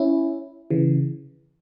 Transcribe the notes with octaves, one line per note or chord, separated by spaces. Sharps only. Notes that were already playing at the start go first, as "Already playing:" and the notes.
Already playing: C#4 E4
C#3 E3